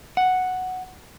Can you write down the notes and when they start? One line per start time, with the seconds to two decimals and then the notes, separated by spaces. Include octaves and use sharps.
0.17 F#5